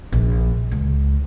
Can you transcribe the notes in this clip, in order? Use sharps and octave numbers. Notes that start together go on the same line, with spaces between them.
A#1
C#2